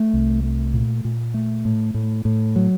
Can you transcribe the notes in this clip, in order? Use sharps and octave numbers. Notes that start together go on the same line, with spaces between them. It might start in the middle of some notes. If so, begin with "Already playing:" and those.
Already playing: A3
C2
A3
A#2
A#2
A3
A2
A2
A2
F#3